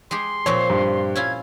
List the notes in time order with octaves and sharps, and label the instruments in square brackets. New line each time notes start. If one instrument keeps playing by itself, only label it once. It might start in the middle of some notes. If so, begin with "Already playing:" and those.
[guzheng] G#3 G4 G#4 [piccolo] C6
[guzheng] A#2 F3 C4 [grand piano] C#5
[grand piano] G2
[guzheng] C#4 E4 F4 [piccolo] G#6